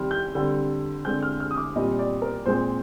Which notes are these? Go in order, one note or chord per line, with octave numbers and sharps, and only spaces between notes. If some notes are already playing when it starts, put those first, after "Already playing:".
Already playing: C3 D#3 G3 C4 F6
G6
D3 G3 C4
D3 G#3 C4 G6
F6
F6
D#6
D6
A#2 G3 C4 D#5
D5
A#4
A#2 G#3 C4 C5